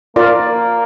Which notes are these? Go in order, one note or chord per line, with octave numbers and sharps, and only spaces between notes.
A#3 F4 A#4 D5